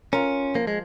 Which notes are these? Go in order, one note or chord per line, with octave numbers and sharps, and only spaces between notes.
C#4 F4 A#4
F3 A#3
G#3